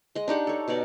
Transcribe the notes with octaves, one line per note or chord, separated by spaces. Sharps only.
G#3 D#5
D4 D#4 G4 F#5
A4 C#5
B2 D#4 C#5 D5